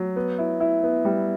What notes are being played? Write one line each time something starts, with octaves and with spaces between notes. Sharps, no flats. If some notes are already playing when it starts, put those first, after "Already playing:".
Already playing: F#3
B3
E4
E4
B3
G3